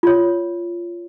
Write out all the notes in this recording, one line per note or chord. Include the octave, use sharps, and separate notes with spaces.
F4 C#5